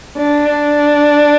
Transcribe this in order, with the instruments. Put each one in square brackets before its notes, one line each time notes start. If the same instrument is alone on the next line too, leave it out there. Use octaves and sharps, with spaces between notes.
[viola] D4